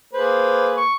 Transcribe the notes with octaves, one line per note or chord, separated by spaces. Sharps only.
A#3 G#4 B4 C5
C#6